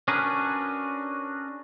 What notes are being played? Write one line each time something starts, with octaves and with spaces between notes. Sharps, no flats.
C#4 D4 F#4 G#4 A#4 B4